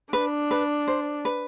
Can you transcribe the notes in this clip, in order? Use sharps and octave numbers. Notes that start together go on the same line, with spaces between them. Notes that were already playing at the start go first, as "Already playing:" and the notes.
D4 B4
B4
C5
B4